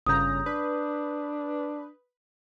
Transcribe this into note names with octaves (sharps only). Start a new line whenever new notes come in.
G1 C#3 A#5 D#6 G6
D4 B4